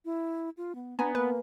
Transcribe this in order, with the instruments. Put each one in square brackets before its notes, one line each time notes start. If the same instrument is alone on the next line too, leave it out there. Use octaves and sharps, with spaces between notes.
[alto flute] E4
F4
B3
[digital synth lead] B3 [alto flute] D4 [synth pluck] G#5 A#5
[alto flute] A#3 [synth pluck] B4